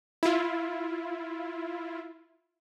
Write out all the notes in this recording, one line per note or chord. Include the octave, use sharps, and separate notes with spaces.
E4 F4